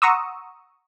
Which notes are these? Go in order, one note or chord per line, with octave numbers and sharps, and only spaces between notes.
F#5 A#5 C6 C#6 D#6 E6